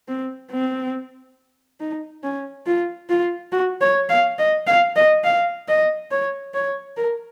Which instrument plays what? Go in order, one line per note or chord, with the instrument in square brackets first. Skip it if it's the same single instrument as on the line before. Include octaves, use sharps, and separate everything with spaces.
[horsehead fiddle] C4
C4
D#4
C#4
F4
F4
F#4
C#5
F5
D#5
F5
D#5
F5
D#5
C#5
C#5
A#4